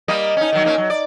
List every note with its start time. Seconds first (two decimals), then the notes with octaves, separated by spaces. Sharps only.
0.08 G3 A#3 D#5
0.37 C#4 D#4
0.53 D#3 F#3
0.65 A#2 A#3 C#4
0.78 F#3
0.90 D5